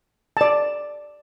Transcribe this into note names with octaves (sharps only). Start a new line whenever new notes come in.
D5 A5